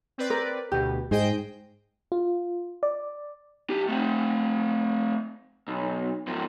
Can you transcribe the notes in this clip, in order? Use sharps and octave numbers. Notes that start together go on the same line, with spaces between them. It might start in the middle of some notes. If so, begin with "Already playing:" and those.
C4 B4 D5
A#4
D2 B2 G4
G#2 G#4 C5 D#5 G5
F4
D5
B1 G4
A3 C4
B1
G#2 F3